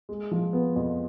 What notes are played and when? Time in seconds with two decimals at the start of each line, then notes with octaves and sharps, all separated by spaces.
0.09 G#3
0.31 F3
0.53 B3
0.76 F2